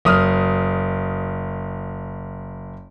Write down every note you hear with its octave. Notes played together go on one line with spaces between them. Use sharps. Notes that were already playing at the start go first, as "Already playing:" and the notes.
F#1 D#6 F6